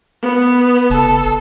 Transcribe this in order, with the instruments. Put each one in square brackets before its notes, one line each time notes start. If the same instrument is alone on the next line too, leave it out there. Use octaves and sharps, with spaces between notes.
[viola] B3
[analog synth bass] F#1 [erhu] A4